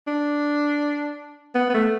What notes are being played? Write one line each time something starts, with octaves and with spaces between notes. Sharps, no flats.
D4
B3
B3
A3